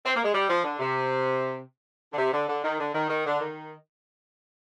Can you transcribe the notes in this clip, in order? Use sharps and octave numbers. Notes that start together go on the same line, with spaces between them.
C4
A#3
G#3
G3
F3
D3
C3
D3
C3
D3
D3
D#3
D3
D#3
D#3
D3
D#3